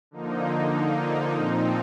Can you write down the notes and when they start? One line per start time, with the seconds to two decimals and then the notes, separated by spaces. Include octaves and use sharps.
0.11 D3 F3 A#3 D#4
1.34 A#2 F3 C4 D#4